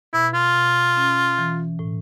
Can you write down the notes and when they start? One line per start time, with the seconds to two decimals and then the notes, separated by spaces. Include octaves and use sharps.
0.13 B2 E4
0.34 F4
0.54 B2
0.97 C#4
1.38 E3
1.79 A2